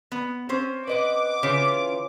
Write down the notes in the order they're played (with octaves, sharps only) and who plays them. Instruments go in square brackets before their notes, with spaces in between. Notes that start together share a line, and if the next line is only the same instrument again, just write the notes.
[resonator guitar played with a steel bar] B3
C4 C#4 C5
[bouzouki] B4 D#5 F#5 [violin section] D6
[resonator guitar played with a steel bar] C#3 [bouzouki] E3 C#4 F4